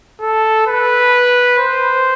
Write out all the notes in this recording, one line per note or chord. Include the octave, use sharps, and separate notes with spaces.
A4
B4
C5